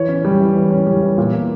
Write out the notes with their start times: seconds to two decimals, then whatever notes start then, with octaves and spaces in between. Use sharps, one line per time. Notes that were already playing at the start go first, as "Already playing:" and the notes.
Already playing: E3 C#5
0.09 C#4
0.25 G3
0.40 E3
0.56 E3
0.71 C#4
0.87 G3
1.02 E3
1.18 A#2
1.33 A#3